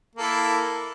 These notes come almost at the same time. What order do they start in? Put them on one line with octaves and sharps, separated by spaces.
A#3 A4 E4